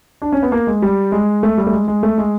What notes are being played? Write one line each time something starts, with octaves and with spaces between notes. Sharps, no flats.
D4
C#4
B3
A#3
G#3
G3
G#3
A3
G3
A3
G#3
G#3
A3
G#3